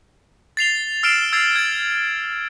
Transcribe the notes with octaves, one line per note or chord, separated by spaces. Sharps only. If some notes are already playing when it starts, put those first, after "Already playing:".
A6 C7 F7 G7
E6 F6 C7 D7 E7 G7
E6 G#6 A6 C7 F7
G#6 A6